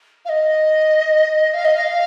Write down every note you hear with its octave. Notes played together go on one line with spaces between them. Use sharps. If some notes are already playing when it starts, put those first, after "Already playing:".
F5
D#5
F5
D#5
F5